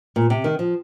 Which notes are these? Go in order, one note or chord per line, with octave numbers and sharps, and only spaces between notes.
A#2
C3
D#3
F3